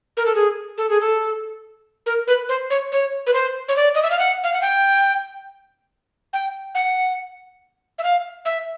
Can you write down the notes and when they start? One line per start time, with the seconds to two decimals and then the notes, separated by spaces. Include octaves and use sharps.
0.17 A#4
0.26 A4
0.35 G#4
0.78 A4
0.89 G#4
1.00 A4
2.06 A#4
2.27 B4
2.49 C5
2.70 C#5
2.92 C#5
3.27 B4
3.34 C5
3.68 C#5
3.76 D5
3.95 D#5
4.03 E5
4.11 F5
4.19 F#5
4.44 F5
4.53 F#5
4.62 G5
6.33 G5
6.75 F#5
7.98 E5
8.03 F5
8.45 E5